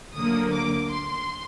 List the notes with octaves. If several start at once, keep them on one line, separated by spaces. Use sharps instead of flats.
D2 D3 F#3 A#3 D#6
D6
C6